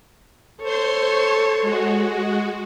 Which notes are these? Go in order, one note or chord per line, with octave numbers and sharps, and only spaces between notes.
A4 C5 C#5 C6
G#3 F#4